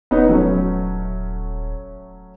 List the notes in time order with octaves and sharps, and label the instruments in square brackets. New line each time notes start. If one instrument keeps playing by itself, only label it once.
[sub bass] D#1 [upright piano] B3 C#4 D#4
[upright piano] F#3 A3 C#4